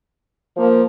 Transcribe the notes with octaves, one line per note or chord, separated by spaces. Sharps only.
F3 A#3